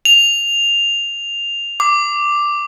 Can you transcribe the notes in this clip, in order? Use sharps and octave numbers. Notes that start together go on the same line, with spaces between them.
F7
D6